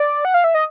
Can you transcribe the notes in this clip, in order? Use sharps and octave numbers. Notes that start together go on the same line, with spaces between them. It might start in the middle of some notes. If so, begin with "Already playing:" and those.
Already playing: D5
F#5
F5
E5
D#5